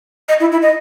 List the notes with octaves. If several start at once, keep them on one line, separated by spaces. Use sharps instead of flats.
D#5
E4
E4
D#5